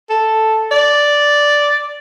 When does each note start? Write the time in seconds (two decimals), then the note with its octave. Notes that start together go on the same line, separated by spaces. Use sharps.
0.10 A4
0.71 D5